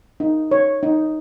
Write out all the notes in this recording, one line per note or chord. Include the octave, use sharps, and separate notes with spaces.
D#4
C#5
D#4